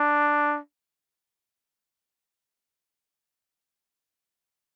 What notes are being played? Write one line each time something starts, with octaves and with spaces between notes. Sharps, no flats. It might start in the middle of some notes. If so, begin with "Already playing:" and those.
Already playing: D4